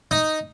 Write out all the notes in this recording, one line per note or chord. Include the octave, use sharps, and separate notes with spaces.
D#4